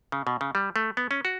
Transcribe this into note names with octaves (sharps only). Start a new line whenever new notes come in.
C#3
B2
C#3
G3
A3
B3
C#4
F#4